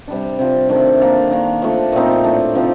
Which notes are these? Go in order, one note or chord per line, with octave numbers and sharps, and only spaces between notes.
C3 G3 D4
C3 F3 C4
C3 D#3 A3 D4
D#3 A#3 D4 A4
D#3 A#3 D4
F3 A3 D4
A#2 A3 C4 D#4
A2 A3 D4
C3 F3 C4 D#4